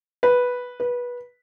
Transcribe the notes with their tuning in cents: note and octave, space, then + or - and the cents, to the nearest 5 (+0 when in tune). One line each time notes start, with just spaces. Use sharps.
B4 -5
B4 -20